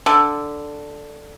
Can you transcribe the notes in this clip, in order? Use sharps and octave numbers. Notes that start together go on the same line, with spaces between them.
D3